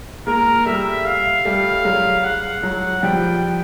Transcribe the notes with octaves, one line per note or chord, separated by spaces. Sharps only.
G#3 A#3 A#4
G3 A3 E5
F5
G3 A3
F#3 G#3
F#5
F#3 G#3
F3 G3 G5